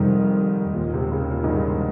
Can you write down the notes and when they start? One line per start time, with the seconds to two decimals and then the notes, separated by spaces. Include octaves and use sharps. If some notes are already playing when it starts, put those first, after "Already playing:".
Already playing: F2 G#2 C3 D#3 G3
0.74 D#2 A#2 D#3 G#3
0.94 C3
1.06 C3
1.12 C#3
1.31 A#2
1.44 G#2
1.49 G2